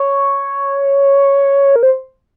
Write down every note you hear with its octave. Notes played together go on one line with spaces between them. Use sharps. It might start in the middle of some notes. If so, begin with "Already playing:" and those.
Already playing: C#5
A#4
C5